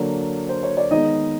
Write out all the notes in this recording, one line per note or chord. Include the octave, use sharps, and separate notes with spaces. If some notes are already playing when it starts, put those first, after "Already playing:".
Already playing: D3 F#3 A#3 D4
C5
C#5
D5
D#3 G#3 B3 D#4 D#5